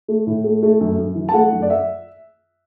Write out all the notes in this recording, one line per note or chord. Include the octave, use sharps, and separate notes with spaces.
A3
A2
A3
A3
F#2
F#2
E3
A5
A3 F#5
F#2
D5
E5